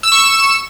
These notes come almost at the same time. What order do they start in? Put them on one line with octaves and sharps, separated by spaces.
E6 E7 C#6